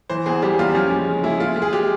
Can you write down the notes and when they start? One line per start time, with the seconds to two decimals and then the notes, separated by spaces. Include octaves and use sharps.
0.10 E3 C5
0.26 E2 G#4
0.42 G3 G4
0.59 E2 F4
0.75 F3 C#4
0.91 G#3
1.07 C#3
1.23 G#3 E4
1.40 G#3 F4
1.56 G#3
1.62 G#4
1.73 G4